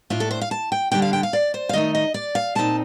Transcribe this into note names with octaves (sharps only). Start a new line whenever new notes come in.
A2 A3 D4 F4
A4
C5
F5
A5
G5
D3 G3 D4 G5
F5
G5
F5
D5
C5
F5
D#3 A3 D#4 D#5
D#5
D5
F5
A#2 F3 C4 D#4 A5